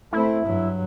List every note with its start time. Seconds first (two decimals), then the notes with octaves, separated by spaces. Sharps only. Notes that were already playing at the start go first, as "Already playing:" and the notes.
0.13 A3 C4 E4
0.46 G2 F#3